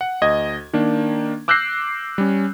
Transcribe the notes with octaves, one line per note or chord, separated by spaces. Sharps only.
F#5
D2 D#5 G#6
D#3 A#3 D4
D6 E6 F#6 G6 A#6 C7
G3 C#4